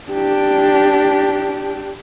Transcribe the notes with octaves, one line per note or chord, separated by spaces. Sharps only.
D4 G4